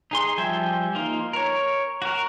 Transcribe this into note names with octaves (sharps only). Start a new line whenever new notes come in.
D#4 G#4 C6
F3 G3 E5 G5 G#5
A#3 D#4 F4
A#4 C#5
F#4 A#4